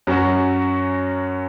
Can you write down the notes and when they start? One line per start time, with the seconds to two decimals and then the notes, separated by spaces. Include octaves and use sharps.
0.07 F#2 F#3 C#4 F#4